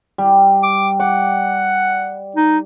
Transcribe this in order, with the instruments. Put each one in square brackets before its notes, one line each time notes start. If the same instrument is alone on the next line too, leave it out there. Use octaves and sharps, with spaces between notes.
[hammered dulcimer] G3
[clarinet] D6
[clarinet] F#5 [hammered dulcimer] D6
[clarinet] D#4